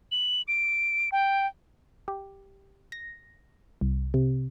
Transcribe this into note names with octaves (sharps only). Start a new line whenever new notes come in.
F#7
D7
G5
G4
A#6
C2
C3